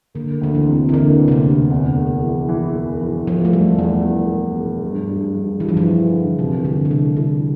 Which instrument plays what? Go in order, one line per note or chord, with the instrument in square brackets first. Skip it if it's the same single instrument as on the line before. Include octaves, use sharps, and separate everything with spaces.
[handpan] D3 [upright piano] A#3
[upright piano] D2 [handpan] D3
[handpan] E3
[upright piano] C3
[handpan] E3
[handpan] D3 [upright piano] A#3
[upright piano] D2
[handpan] C3
D3
[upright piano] D2
E2
E1
E3
E3
E1
E3
[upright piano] E1 [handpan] F3
[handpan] A3
[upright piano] E1 [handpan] G3
[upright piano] E2 [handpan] E3
[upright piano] E1
E1
E1
G2
G2
G2
[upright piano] G2 [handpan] E3
[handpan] F3
E3
[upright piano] G2
D3
[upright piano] C2 [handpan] C3
[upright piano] C2 [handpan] D3
[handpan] D3
[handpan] C3 [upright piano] A3
[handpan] D3 [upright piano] E4